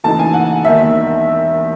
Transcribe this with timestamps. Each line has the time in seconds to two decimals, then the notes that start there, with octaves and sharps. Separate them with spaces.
0.04 F#1 F#2 E3 A3 D#4 A5
0.19 G#5
0.34 F#5
0.64 E1 D#2 D#3 E5